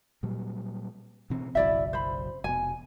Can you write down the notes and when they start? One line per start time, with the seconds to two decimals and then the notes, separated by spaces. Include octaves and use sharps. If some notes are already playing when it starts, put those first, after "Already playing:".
0.23 A#2 F#3 G3
1.30 B2 E3 C4
1.55 F#1 B1 F#3 E4 D5 E5
1.93 C5 B5
2.44 F1 B2 G#5